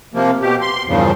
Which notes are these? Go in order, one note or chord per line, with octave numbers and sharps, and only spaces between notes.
C3 F3 A#3
B2 G4
C6
E2 G2 A#2 C#3 F3